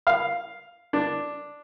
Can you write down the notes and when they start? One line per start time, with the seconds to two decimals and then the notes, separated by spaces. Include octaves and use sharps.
0.07 F5
0.93 D4